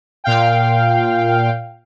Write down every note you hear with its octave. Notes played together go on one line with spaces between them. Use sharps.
A#2 F5 G5